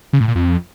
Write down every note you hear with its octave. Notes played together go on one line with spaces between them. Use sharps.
C#3
A2
A#2
F2